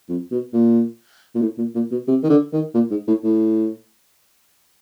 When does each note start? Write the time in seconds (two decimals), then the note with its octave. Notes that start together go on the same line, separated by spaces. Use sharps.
0.09 F2
0.31 B2
0.53 A#2
1.35 A#2
1.42 A2
1.58 A#2
1.75 A#2
1.92 B2
2.08 C3
2.24 D#3
2.30 D3
2.53 D#3
2.74 A#2
2.91 G#2
3.08 A2
3.24 A2